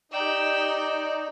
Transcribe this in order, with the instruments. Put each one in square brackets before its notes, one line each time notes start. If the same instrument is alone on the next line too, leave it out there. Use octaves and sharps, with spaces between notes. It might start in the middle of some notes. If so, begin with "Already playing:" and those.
[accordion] D#4 [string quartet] G4 G5 E6 [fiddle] D5